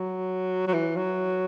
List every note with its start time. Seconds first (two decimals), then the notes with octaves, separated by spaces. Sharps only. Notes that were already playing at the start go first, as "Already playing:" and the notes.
Already playing: F#3
0.67 F#3
0.74 E3
0.97 F#3